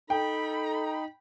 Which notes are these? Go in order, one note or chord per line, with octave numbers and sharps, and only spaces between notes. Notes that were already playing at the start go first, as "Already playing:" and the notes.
D#4 A4 G5 B5